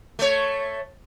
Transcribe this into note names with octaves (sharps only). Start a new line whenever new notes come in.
A3 C#5